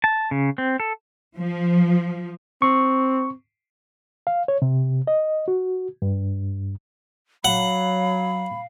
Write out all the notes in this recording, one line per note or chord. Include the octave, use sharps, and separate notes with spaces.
A5
C#3
C4
A4
F3
C4 C#6
F5
C#5
C3
D#5
F#4
G2
F#3 F5 F#5 B5